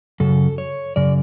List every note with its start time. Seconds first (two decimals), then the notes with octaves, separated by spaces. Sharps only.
0.20 F#2 C#3 A4
0.58 C#5
0.96 F#2 C#3 D5